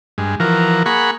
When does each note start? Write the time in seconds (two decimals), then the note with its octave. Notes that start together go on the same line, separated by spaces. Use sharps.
0.18 G2 G#3
0.40 E3 F3 F#4 A#4
0.86 A#3 G#4 F#5 B5 C#6